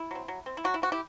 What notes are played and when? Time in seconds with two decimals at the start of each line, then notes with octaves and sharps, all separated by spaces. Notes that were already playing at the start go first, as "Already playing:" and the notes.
Already playing: E4
0.11 F#3 C4
0.28 F#3
0.46 C4
0.57 E4
0.64 F#3 F#4
0.74 E4
0.82 C4 F#4
0.92 E4 G4